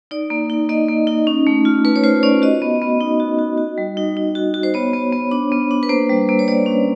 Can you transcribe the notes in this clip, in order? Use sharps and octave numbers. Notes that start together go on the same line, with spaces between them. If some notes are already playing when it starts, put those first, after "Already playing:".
D#4 D5
A#3
D#4
A#3 D#5
A#3
D#4
C#4
A3
F4
A3 B4
C#5
F4 C5
C#4 D5
F#4 D#5
B3
B3
D#4
F#4
F#4
F#4
G3
D#4
D#4
F#4
F#4
C5
B3 C#5
B3
B3
D4
B3
D4
B4
A#3 C5
G3
A#3
C#5
G3 D5
C#4